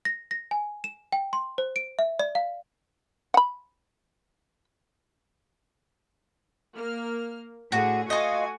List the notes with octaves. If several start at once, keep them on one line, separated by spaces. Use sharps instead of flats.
A#6
A#6
G#5
E7
G5
C6
C5
D7
E5
D5
F5
F#5 B5
A#3 F6
A2 D3 F#4 G#4
A3 F4 F#4 D#5 G#5